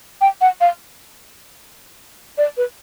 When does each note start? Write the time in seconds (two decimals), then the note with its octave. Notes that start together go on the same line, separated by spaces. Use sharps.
0.21 G5
0.41 F#5
0.61 F5
2.38 D5
2.57 B4